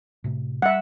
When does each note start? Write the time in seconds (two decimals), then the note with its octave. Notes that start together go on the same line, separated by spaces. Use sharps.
0.24 A2 C3
0.62 G3 E5 F#5